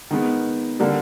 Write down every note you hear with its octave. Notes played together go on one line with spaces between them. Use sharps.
D#3 G#3 B3
D3 G3 A#3